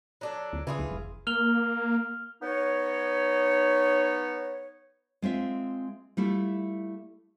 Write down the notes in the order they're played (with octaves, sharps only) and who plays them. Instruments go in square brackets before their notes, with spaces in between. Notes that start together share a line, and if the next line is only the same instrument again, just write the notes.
[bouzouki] F#3 D4 A4
[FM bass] D2
[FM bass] C#3 [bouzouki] E3 F4 G#4
[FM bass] C#2
F1
[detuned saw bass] A#3 [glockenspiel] F6 F7 G7
[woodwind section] B3 D#4 C#5
[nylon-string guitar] G#3 C4 F4 E5
G3 A3 E4 F4